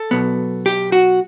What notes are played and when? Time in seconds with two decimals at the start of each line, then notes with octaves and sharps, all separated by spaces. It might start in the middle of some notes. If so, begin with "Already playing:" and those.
Already playing: A4
0.11 B2 F#3 B3
0.66 G4
0.92 F#4